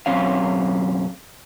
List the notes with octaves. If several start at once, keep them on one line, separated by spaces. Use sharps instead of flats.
B1 F#2 C4 C#4 F5